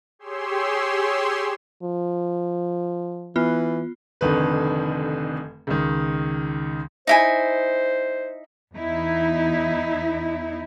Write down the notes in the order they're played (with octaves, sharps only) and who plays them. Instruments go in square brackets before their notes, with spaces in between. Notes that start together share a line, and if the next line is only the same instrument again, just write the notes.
[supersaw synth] G4 G#4 C#5 C6 E6
[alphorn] F3
[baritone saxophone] E3 [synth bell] B3 F4
[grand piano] F1 F2 D3 D#3 B4
C#2 D#3
[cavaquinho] D#4 E4 G#5 [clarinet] C5
[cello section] E2 D#4 E4